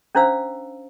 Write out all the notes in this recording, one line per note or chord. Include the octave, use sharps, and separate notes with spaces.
C#4 D4 E4 C5 F5 E6